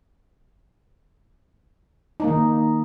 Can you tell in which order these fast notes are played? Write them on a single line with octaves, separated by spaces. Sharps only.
D#4 A#3 D#3